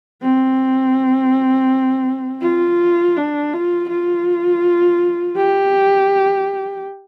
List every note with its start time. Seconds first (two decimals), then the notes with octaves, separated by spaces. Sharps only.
0.22 C4
2.42 F4
3.17 D4
3.53 F4
3.90 F4
5.37 G4